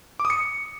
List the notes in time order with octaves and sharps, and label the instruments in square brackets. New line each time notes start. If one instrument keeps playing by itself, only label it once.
[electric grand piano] D6
D#6
C#7